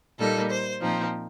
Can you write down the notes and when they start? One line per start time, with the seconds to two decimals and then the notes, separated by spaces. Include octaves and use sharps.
0.19 A#2 G3 A#3 D#4 A4
0.50 C5
0.81 A#2 F3 C4 D#4